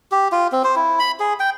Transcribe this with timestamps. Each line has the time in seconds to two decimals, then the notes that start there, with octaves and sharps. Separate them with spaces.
0.12 G4
0.32 F4
0.52 C4
0.64 C5
0.76 E4
0.99 B5
1.20 G#4
1.40 G5